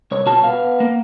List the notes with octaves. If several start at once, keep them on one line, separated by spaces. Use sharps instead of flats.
C2 C#5
B2 F#4 A5
B3 F5
A#3